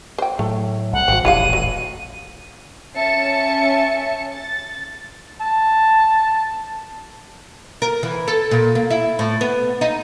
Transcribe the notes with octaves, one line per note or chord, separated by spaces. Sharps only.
C5 G5
A2 F#3 A3
C2 F#5
G#1 C4 F#4
D#1 A1 F2 E4 G4 F5 D#7
F#3
C#4 E5 G#5 A5 C#7
A6
A5
A#4
E3
A4
A#2
A#3
E4
A2
B3
D#4